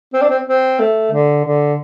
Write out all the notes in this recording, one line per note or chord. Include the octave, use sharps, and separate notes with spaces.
C4
D4
C4
C4
A3
D3
D3